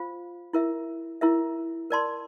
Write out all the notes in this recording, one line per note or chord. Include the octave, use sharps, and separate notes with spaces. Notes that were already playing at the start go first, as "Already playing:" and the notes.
Already playing: F4 C5 F5
E4 A#4 E5
E4 A#4 E5
A#4 D5 A5 C6